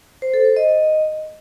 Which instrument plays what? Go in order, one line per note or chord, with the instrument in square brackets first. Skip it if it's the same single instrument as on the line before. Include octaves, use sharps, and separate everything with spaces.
[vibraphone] C5
A4
C5
D#5